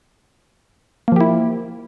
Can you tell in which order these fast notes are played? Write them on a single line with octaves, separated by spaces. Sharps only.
A#3 F3 G4 E4